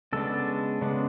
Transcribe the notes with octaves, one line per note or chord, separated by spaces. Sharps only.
C#3 G#3 B3 D4 A4
C#3 G#3 B3 D4